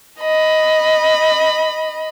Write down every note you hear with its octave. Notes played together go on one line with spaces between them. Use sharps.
D#5 B5